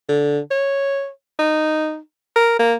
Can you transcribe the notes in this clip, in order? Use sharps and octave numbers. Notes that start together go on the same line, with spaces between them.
D3
C#5
D#4
A#4
A#3